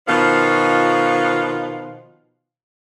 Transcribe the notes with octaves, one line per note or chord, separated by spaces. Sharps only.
B2 D#3 F3 F4